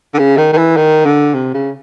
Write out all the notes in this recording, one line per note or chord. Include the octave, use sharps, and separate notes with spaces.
D3
C#3
D#3
D#3
E3
D#3
D3
C3
C#3